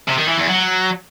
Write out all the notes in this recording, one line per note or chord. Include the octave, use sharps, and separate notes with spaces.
C3
D#3
E3
E2
F#3